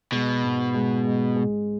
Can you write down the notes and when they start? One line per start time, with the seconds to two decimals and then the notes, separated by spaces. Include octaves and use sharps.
0.12 B2 G#3
0.43 G#2
0.75 G#3
1.05 G#3
1.36 G#3